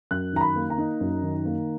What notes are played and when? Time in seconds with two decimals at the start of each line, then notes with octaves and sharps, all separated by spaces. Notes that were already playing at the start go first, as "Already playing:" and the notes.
0.11 F#2 F#6
0.33 D#3 A#5
0.41 B5
0.56 A#3
0.70 A#5
0.78 D#4
1.01 F#2
1.23 D#3
1.45 A#3